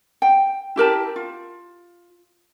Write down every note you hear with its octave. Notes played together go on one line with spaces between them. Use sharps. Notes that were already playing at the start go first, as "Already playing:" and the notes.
G5
E4 G4 A#4 A5
F4